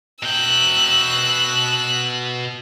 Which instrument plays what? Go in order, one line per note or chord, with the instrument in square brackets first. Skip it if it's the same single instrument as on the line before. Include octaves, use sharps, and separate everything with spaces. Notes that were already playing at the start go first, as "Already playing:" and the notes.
[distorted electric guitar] B2 G5 [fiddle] E6 F#6